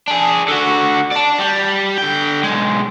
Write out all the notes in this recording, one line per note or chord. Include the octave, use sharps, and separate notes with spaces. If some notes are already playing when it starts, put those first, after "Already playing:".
D4 G#4
D3 F#4
D5 A5
G3
D3 G5
B1 G#3